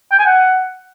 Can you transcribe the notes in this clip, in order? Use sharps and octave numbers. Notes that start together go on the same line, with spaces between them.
G5
G#5
F#5